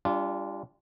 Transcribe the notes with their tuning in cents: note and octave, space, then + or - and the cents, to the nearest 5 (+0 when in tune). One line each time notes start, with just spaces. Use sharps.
G3 +25 D4 -20 F4 -20